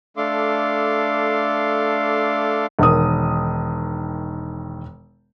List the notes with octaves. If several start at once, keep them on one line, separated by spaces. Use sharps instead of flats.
A3 D4 A4 F5 C6 D6
E1 D#3 D#6